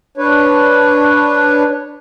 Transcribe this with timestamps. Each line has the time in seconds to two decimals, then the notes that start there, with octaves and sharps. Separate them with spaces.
0.18 D4 B4 C#5